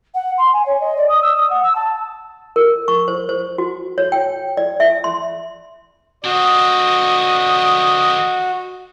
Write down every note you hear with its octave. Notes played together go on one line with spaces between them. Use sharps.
F#5
C6
G#5
C#5
D#5
D5
D#6
E6
D#6
F#5
E6
A5
A#4
C#6
C5
C5
F#4
C#5
G5
D5
E5
C6
D3 C4 F#4 D#5